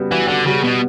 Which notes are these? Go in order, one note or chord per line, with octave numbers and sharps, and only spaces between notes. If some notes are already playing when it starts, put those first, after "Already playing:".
Already playing: C#3 G3 B3 F#4
E3 F#4
D3 F#4
C#3 G3
B2 B3